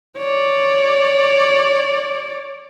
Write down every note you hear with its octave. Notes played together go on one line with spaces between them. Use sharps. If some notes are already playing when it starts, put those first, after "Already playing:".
C#5 D5